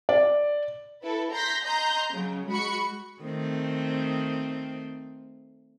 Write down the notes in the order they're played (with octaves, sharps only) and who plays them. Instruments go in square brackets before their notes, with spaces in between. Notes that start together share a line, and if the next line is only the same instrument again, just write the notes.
[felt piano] D5
[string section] E4 A4 B4
A#5 C6 G6 A#6 B6
D#5 A#5 C6 G6
C#3 F#3
G#3 F#4 B5 C#6 C#7
[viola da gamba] D#3 A3 C4